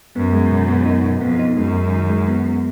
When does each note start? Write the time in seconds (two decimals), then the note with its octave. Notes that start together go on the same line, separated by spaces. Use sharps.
0.15 F#2 B3
0.33 G#3
0.51 B2
0.69 B3
0.86 D#4
1.04 B2
1.21 F2 B3
1.39 D#4
1.57 F#2 G#3
1.75 G#3
1.92 D#3
2.10 G#3
2.28 B3
2.44 B3